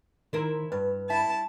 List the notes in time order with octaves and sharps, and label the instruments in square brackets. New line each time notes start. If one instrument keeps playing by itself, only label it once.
[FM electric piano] D#3 [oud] E4 A#4 C5
[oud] G2 [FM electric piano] B4
[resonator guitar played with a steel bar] E4 [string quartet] A5